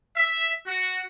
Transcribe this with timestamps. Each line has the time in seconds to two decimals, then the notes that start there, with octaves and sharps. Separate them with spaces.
0.16 E5
0.67 F#4